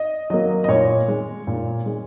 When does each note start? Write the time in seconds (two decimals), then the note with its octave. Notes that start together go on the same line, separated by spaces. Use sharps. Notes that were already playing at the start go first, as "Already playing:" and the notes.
Already playing: D#5
0.30 F#3 A#3 D#5
0.64 D#5
0.68 A#2 C#5
1.08 G#3
1.47 A#2
1.86 G#3